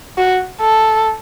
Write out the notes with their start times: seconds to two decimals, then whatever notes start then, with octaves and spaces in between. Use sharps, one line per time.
0.18 F#4
0.61 A4